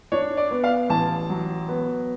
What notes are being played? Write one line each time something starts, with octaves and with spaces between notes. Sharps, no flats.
D4 C#5
D5
B3
F5
A1 A5
F#3
B3